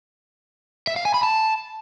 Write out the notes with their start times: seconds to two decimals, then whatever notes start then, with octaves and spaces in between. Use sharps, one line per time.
0.87 E5
0.96 F5
1.05 G#5
1.14 B5
1.23 A5